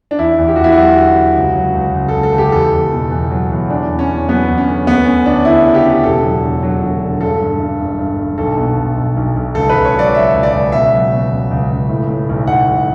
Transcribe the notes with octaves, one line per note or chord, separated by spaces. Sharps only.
D4
E2 E4
E2
G4
E2 F#4
E4
F#3 F#4
D3
D3
C#2
F#3
C#2
C#2
A4
C#2
A4
C#2
G4
E2 A4
E2
B2
E2
F#3
E2
E2 D4
E2
C#4
E2
F#3 B3
E2
C#4
D3
D2 B3
D2 C#4
D2 D4
D2 E4
C#3
G4
C#3
E1 A4
F#3
D3
F#3
E1
D3
G2 A4
G2
G2
G1
G2
G2
B1 A4
B2
B1
B1
B1
B1
C#2 A4
C#2 B4
C#5
F#3 D5
F#3 E5
C#2
D5
C#2
B2 E5
F#3
B2
C#2
C#2
C#2
A2
A2
B1
B1 F#5
B1